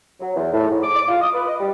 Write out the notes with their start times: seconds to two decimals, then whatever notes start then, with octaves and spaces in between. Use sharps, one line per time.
0.20 F#3
0.35 E2
0.53 A2
0.69 G#2
0.83 D6
0.96 D6
1.08 F4
1.21 D#6
1.33 B4
1.48 D#5
1.59 G3